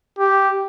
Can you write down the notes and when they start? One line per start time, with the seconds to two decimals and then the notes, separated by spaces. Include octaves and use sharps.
0.19 G4